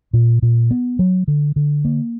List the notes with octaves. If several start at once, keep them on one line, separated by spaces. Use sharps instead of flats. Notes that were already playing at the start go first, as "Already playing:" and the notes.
A#2
A#2
B3
F#3
D3
D3
A#3